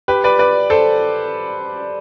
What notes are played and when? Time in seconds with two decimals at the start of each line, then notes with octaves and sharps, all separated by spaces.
0.08 G4 B4
0.24 B4 D5
0.39 B4 D5
0.70 A4 C5